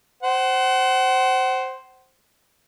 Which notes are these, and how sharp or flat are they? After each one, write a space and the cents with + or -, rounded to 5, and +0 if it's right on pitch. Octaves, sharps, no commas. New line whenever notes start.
C5 +0 F#5 +35